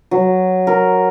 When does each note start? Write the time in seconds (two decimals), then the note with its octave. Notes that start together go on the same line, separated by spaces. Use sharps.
0.11 F#3
0.67 A#4